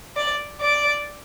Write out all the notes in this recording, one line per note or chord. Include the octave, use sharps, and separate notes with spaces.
D5
D5